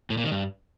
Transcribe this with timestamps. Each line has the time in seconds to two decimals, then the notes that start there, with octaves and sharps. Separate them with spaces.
0.10 A2
0.17 A#2
0.24 D#3
0.31 G2